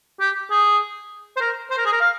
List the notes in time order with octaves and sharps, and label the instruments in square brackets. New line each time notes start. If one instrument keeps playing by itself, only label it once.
[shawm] G4
G#4
C5
A#4
C5
A#4
G#4
A#4
F5